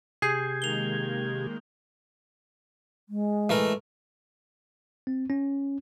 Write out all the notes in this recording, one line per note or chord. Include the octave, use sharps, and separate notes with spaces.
C3 G4 G#4 G6 G#6 C7
D#3 G#3 A#3 F7 G7
G#3
E3 A3 A#4
C4
C#4